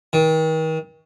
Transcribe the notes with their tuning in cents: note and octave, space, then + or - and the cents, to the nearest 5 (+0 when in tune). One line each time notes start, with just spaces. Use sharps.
D#3 +40